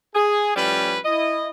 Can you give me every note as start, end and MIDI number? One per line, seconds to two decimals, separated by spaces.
0.15 0.56 68
0.56 0.99 45
0.56 0.99 53
0.56 0.99 55
0.56 0.99 61
0.56 0.99 71
1.05 1.49 64
1.05 1.49 75